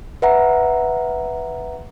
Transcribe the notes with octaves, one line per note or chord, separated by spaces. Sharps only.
B4 E5 F#5 A#5